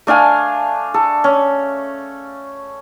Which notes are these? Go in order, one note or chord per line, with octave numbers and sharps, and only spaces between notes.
A3 D4 F5 G#5
A4
C#4